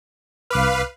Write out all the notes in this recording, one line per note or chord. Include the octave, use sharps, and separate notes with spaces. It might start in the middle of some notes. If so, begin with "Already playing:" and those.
C2 B4 F5 D6 F6